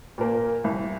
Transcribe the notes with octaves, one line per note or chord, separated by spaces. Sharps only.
A#2 A#3
C2